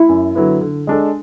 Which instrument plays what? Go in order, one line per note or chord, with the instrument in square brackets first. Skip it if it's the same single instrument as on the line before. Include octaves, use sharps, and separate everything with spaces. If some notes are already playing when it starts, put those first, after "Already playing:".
Already playing: [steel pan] E4
[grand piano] F#2
D3 F#3 B3 E4
D3
G#3 D4 A4